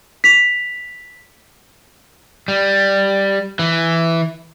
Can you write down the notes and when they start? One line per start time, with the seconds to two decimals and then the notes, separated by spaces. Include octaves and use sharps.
0.24 B6 F7
2.48 G3
3.59 E3